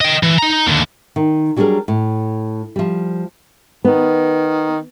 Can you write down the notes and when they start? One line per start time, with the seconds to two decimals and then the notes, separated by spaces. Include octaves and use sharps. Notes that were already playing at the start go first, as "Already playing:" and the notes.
0.01 D#5 G5
0.23 E3
0.38 D#4 A#5
0.66 D#2 D3
1.16 D#3
1.56 F#3 G3 D4 F4 G#4 A#4
1.88 A2
2.76 F3 G3
3.85 D#3 B3